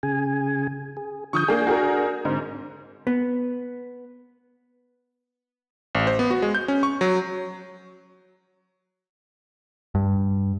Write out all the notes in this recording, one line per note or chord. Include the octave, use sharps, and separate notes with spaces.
C#3 G#4 G#5
G#4
D3 F3 C#6 D#6 G6
A#3 D4 G#4
F#4 G#4 A#4
G#2 D3 C4
B3
A1
C5
B3
F#4
G#3
G6
C#4
C#6
F#3
G2